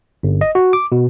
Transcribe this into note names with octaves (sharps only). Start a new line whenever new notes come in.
G1
D#5
F#4
D6
B2